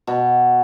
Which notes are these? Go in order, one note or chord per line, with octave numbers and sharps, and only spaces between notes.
B2